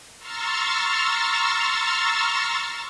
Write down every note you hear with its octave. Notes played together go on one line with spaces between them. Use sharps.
A#5 C6 C#6 E6 F6 A6